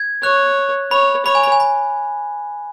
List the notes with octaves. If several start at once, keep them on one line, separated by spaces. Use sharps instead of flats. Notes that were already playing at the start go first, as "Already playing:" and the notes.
Already playing: G#6
C#5 F#6
C#5 B5
C#5 B5
G#5
B5
G#5
B5